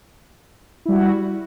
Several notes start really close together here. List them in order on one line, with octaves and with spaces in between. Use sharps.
E4 G3 F#4